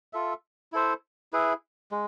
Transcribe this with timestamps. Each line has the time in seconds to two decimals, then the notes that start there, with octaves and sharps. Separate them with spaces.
0.13 F4 A4 E5
0.72 E4 A4 C5 E5
1.33 E4 G#4 B4 E5
1.92 G#3